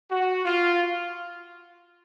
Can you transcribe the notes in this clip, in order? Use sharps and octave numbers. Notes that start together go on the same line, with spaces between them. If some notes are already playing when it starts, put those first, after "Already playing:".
F#4
F4